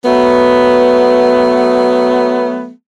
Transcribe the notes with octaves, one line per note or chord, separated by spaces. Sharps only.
F#3 A3 B3